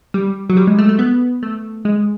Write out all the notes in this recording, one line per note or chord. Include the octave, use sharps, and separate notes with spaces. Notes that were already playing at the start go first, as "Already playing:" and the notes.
G3
F#3
G3
G#3
A3
A3
B3
A3
G#3